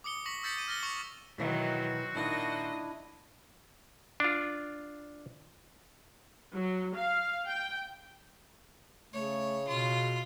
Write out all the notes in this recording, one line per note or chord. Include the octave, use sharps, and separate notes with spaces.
D6 D#6 C#7 G7
C#6 A#6 B6 C#7 F#7 G7
E6 G6 A6 B6 C#7 F#7
B6 D#7
F6 A6 A#6 G7
C#6 D6 B6 C#7 F7 G7
B2 D#3 E3 F#3 C4 F#4 E5
A#2 D#3 D4 E4 D#5
D4 F4
F#3
F5
G5
C#3 A3 C#5
B2 F4